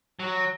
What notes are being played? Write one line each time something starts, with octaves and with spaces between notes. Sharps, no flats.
F#3